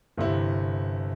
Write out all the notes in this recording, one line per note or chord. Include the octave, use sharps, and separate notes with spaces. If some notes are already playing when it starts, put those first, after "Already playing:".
G1 C3 E4